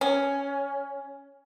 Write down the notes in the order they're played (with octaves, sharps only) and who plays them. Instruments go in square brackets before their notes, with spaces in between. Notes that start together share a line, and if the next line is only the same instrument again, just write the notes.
[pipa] C#4